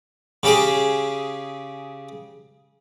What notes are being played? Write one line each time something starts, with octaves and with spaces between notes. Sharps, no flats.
C#3 G4 G#4